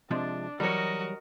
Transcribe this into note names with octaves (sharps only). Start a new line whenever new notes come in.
C3 F3 G#3 D4
E3 F#3 G3 F#4 A#4 C#5 D#5